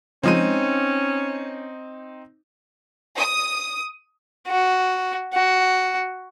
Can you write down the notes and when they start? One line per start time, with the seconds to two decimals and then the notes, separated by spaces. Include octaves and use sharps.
0.23 C#3 F3 G#3 C4 C#4 D#4 D#7
3.17 D#6
4.48 F#4
5.34 F#4